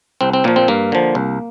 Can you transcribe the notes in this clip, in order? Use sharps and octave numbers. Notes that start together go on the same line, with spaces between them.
C2 C4
C4
A#2 F3 A#3
C4
G2 A#3
D3 F3
C2